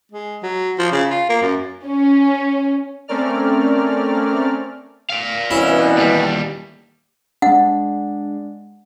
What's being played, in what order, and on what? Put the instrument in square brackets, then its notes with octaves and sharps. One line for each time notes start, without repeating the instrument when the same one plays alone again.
[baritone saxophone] G#3
F#3
F3
C#3
F4
A#3
F#2
[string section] C#4
[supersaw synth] A3 C4 C#4 A#4 D5 F6
[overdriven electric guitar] D5 F5
[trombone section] C2 B2 E3 [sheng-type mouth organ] C#4 [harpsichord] E4
[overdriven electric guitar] D#2 G3 [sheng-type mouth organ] A5
[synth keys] G#3 D4 [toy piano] F#5